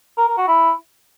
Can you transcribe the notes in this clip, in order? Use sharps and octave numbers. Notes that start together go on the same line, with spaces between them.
A#4
A#4
F#4
E4